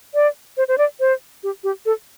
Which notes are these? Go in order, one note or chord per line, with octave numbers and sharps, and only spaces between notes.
D5
C5
C5
D5
C5
G4
G4
A4